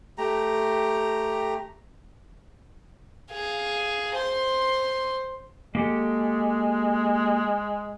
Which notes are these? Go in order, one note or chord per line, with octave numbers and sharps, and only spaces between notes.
A3 G4 A#5
G#4 F5
C5 C6
G#3 A#3 G4 A4